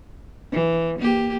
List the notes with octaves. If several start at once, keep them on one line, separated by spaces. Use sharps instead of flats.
E3
A#3 G4